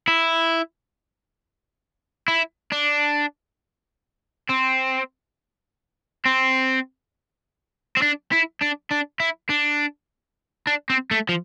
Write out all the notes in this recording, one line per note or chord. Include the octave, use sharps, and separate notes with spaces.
E4
E4
D4
C4
C4
C4
D4
E4
D4
D4
E4
D4
D4
C4
A3
F3